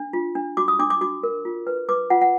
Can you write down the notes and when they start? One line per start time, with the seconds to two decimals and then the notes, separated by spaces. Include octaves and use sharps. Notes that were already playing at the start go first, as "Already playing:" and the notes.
Already playing: D4
0.13 F4
0.35 D4
0.57 F#4 D6
0.68 D#6
0.79 D4 D6
0.90 D6
1.01 F#4 D6
1.23 A#4
1.45 F4
1.67 B4
1.89 B4 D6
2.10 F4 F#5
2.21 F#5